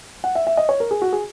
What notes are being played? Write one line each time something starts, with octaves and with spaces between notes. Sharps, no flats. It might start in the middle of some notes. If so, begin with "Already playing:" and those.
F#5
E5
E5
D#5
C#5
A#4
G#4
F#4
G#4